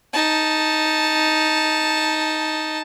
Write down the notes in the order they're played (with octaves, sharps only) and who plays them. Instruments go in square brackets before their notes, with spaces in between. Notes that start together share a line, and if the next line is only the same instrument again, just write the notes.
[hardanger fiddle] D#4 A5